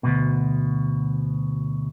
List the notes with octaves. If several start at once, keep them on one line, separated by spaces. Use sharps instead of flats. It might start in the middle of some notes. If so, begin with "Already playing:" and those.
D2 G2 B2